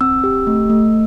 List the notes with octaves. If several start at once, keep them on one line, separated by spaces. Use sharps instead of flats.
C4 E6
G4
A3
A3